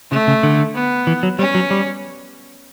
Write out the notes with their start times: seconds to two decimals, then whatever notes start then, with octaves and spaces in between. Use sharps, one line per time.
0.12 C#3 A3
0.28 C#3
0.43 D3
0.75 B3
1.07 E3
1.23 F#3
1.39 G3 C#4
1.55 F#3
1.71 G3